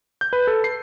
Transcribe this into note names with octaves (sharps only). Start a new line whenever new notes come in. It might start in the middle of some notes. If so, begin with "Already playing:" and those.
G6
B4
A4
C7